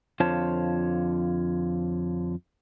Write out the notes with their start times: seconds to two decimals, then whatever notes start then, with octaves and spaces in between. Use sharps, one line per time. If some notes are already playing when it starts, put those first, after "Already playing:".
0.20 F2 D3 F4 C5 C#5 A5